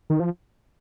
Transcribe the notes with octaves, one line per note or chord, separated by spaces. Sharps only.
D#3
F3